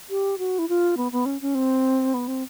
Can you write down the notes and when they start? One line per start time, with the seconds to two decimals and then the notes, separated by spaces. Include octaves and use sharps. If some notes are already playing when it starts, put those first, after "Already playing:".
0.10 G4
0.38 F#4
0.59 E4
0.69 F4
0.97 B3
1.12 B3
1.26 C#4
1.41 C#4
1.55 C4
2.14 B3
2.28 C4